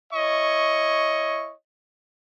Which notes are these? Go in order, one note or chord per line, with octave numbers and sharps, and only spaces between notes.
E4 C#5 D#5 C#6